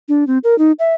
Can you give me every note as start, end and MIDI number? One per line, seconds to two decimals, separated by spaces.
0.08 0.26 62
0.27 0.38 60
0.44 0.57 70
0.58 0.72 63
0.79 0.94 76